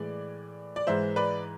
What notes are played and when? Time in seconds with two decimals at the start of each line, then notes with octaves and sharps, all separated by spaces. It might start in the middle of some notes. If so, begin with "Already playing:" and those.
Already playing: A2 E3 G#3 D5
0.76 D5
0.87 G#2 E3 G#3 C5 E5
1.16 B4 D5